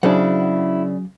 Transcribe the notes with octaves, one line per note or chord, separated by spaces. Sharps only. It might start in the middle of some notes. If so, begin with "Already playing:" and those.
C#3 F#3 D4 E4 G#4 C5 F#5